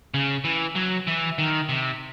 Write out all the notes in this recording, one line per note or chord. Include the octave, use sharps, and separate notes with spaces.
C#3
E3
F#3
E3
D#3
C3